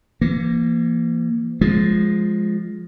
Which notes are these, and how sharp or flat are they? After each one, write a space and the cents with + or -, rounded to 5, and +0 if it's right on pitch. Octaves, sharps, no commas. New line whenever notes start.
E3 +45 A#3 +0
F3 +0 G#3 +0